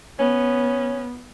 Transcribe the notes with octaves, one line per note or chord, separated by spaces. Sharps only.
B3 C#4